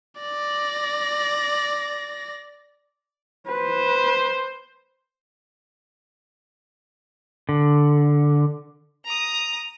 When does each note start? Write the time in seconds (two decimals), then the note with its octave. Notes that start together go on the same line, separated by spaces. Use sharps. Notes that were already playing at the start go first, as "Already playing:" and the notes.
0.21 D5 A#6
3.47 B4 C5
7.49 D3
9.05 A#5 D#6